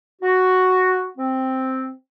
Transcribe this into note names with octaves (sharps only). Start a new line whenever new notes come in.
F#4
C4